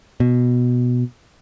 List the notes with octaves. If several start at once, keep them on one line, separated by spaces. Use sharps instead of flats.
B2